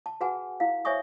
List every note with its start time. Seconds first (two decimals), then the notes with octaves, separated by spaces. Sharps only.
0.06 A5
0.21 F#4 G#4 B4 F#5 G#5
0.60 E4 F5
0.85 C5 C#5 E5 G#5 C#6 D#6